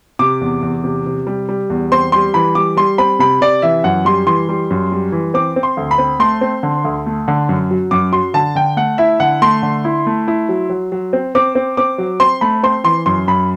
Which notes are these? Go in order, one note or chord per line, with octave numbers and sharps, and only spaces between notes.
C3 D6
E2
E2
C3
C3
G3
G3
E2
C4 C6
G3 C6
E3 B5
G3 D6
G3 C6
C4 B5
C3 B5
C3 D5
E3 E5
F#2 F#5
G3 C6
E3 C6
G3
F#2
G3
E3
C4 D6
C4
C6
D2
B5
C4
A3 C6
C4
D3
D2
A3
D3
F#2
F#3
F#2 D6
F#3 C6
D3 A5
D3 G5
A3 F#5
E4 E5
D3 F#5
A3 C6
D3
E4
A3
E4
F#3
F#3
F#3
C4
C4 D6
C4
C4 D6
F#3
C4 C6
A3 B5
C4 C6
E3 C6
F#2 C6
F#2 B5